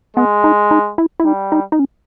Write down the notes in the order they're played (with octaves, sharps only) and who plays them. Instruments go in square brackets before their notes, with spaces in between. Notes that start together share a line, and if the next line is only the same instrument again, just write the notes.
[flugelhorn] G#3 [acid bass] B3
[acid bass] D#4
D#4
E4
E4
[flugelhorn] G3 [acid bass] D#4
[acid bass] D#4
D#4
C#4